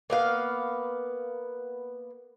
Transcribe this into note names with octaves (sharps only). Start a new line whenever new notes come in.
A#3 B3 F5